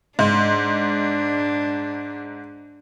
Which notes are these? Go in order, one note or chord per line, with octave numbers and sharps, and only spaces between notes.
G#2 D4